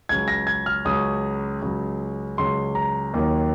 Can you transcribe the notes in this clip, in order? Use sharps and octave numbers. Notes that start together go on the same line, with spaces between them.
C#2 C#3 F#3 G#6
A#6
G#6
F6
C#2 C#3 F#3 D#6
C#2 C#3 F#3
C#2 C#3 F#3 C6
A#5
D#2 D#3 F#3 A#3